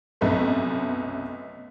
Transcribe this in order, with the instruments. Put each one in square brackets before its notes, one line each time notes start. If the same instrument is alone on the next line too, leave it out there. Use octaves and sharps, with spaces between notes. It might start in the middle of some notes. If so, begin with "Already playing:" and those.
[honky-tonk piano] B1 F#2 C3 A3 B3